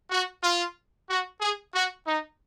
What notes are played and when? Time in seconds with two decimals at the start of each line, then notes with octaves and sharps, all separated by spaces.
0.10 F#4
0.43 F4
1.08 F#4
1.41 G#4
1.73 F#4
2.06 D#4